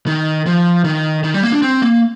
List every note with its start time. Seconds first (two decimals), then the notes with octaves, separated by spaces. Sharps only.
0.07 D#3
0.46 F3
0.85 D#3
1.24 D#3
1.34 G3
1.43 A#3
1.52 D4
1.62 C4
1.82 A#3